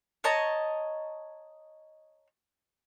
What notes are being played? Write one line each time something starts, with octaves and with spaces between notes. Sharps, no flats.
C#5 D#5 A5 A#5